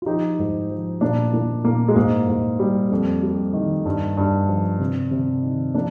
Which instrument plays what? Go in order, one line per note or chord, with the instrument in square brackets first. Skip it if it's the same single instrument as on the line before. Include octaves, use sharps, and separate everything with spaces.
[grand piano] F4
F3 D#4 G4
G#2
F3
A#2 A#3 D4
A#2 A#3
A#2 A#3
G#3
G#2 A#3
G#2
G3
F2
G3
D#3
G2
G2
F3
C3
C3
D#3
F3 A#3 D4